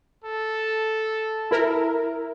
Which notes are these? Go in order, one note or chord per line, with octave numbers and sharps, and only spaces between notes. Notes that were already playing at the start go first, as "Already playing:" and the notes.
A4
E4 A#4